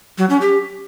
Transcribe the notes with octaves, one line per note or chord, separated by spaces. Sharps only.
F#3
C#4
G4